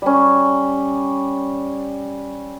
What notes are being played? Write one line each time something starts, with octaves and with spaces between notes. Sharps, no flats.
G3 C#4